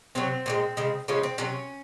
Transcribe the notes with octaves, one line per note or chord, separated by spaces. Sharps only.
C3 F#3 C4
A#2 F3 G#3
C#3 G#3
C#3 F3 G#3 C#4
C4
C3 F#3 C#4